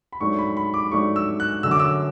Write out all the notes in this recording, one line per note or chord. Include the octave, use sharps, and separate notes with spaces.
B5
G#2 F#3 A3 D4 C#6
B5
B5
D6
G#2 F#3 A3 D4 C#6
E6
F#6
F#2 D3 F#3 A3 E6
D6
E6